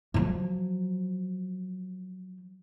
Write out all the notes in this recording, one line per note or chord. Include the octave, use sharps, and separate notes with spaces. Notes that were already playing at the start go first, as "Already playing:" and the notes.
F3 F#3